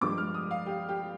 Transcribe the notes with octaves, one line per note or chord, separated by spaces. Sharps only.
G2 F3 G#3 D6
F6
D#6
F5
G4
G4